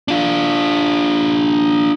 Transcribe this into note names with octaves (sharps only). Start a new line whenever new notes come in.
D4 F4